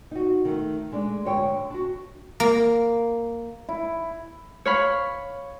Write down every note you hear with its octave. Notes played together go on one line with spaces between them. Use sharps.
D#4 F#4
D#3 A3
G#3 A3 D4
G#2 D3 C#5 G5
D4 F#4
A#3
E4
C#5 F5 B5